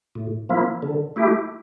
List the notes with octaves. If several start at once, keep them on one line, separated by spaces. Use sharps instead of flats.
A2
F3 A#3 E4
D3
A3 E4 G4